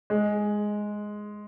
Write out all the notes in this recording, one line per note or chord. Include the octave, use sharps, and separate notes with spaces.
G#3